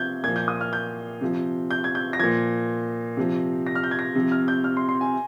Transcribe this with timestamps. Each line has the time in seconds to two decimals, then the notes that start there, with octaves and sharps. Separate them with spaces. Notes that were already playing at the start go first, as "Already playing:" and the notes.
Already playing: C3 F3 G6 G#6
0.24 A#2 F3 G#6
0.36 G6
0.48 D#6
0.61 F6
0.73 G6
1.21 C3 F3
1.71 G6
1.84 G#6
1.95 G6
2.13 A#6
2.19 A#2 F3 G#6
3.17 C3 F3
3.67 A#6
3.75 F6
3.84 G6
3.91 G#6
3.99 A#6
4.15 C3 F3
4.32 F6
4.48 G6
4.64 F6
4.77 C6
4.89 C6
5.01 G#5